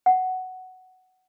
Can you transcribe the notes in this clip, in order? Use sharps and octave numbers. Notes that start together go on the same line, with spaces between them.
F#5